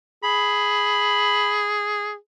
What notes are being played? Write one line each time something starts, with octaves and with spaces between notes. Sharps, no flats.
G#4 B5